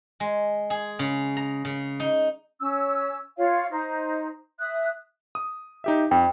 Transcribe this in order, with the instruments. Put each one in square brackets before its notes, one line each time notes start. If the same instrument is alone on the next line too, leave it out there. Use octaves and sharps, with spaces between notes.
[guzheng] G#3
G#4
C#3
A#5
C#3
D#4
[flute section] C#4 E6
F4 C#5 F5
D#4 C5 A#5
E5 D#6 F#6
[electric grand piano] D#6
D#4 G4 E5
[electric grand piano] F2 [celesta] G5